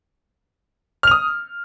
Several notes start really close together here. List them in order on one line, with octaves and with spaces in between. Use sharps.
F6 F7 D#6